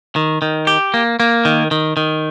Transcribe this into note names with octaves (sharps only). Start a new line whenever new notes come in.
D#3
D#3
G4
A#3
A#3
D#3
D#3
D#3